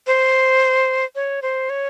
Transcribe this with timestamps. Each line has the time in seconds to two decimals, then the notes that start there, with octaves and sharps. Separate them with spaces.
0.07 C5
1.15 C#5
1.42 C5
1.70 C#5